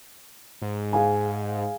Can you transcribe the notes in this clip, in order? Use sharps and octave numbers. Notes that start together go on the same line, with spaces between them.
G#2
G#4 F5 G#5